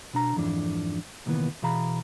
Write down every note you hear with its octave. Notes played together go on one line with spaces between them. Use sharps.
B2 D4 A#5
F2 G#2 E3 D4
C2 A#2 D#3 E3 B3
B2 E3 G#4 F5 A#5 B5